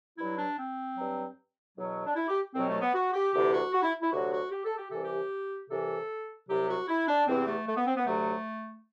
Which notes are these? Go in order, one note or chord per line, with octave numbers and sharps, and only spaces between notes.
G2 F#3 E4
D4
C4
G2 F#3
E2 B2 F#3
D4
E4
G4
C2 B2 F#3 C4
A3
B3
F#4
G4
D2 C3 E3 G4
F#4
F#4
E4
E4
D2 C3 F#3 F#4
F#4
G4
A4
G4
C2 C3 E3 A4
G4
C2 C3 E3 A4
C2 C3 F#3 G4
F#4
E4
D4
E2 C3 E3 C4
A3
A3
B3
C4
B3
D2 C3 F#3 A3